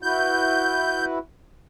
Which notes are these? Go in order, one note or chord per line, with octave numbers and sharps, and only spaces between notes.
E4 F#4 B4 G6